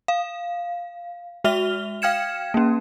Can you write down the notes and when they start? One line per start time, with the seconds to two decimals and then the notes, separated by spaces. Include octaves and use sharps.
0.08 F5
1.44 G#3 F#4 E5 F6 F7 G7
2.02 F5 G5 F6 G#6 C#7 E7
2.54 A#3 C#4